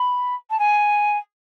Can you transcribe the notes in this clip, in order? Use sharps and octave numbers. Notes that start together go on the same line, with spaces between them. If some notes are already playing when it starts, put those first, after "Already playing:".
Already playing: B5
A5
G#5